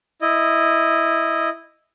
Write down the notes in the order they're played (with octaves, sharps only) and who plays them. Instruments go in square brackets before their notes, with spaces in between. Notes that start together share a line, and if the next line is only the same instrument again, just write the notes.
[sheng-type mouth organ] E4 D#5